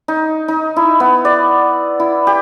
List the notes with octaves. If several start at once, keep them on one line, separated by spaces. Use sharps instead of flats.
D#4
D#4
E4
B3
D5
E4
G4